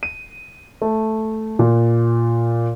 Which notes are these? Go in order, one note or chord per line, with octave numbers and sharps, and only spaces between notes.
D#7
A3
A#2